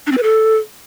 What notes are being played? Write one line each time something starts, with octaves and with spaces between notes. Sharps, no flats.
D4
C4
B4
A4